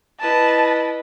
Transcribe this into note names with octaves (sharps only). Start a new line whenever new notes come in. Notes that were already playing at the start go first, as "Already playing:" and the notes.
E4 B4 D#5 A5